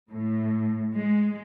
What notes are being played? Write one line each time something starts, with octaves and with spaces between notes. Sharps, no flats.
A2
G#3